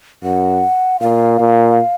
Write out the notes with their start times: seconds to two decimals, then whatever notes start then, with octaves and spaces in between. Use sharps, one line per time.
0.23 F#2 F#5
1.00 A#2 F5
1.39 A#2